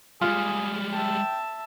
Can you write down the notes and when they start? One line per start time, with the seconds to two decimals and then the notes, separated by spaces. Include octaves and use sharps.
0.21 G3 G#3 F4 G#4
0.93 E5 G5 A5